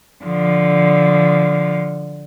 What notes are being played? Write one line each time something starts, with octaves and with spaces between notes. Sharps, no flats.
D3 F3